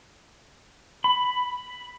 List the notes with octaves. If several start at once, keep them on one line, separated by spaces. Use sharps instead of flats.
B5